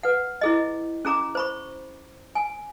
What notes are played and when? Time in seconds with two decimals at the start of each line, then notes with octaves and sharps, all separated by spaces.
0.03 B4 F#5
0.41 E4 G#4 D#5
1.05 C#4 G#4 A#5 D6
1.35 C5 B5 C#6
2.35 G#5